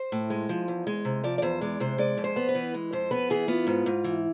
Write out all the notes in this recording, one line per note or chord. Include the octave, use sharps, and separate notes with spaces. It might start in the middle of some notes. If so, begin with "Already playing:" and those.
Already playing: C5
A2
G#3
F3
E2
G#3
C3
F3 D5
D5
E2 C5
G#3 D5
C3 C5
G#3 D5
F2
C5
B3
B4
E3
G#3
F2 C5
B3 B4
E3 G#4
B3 F4
G#2
G#2
E3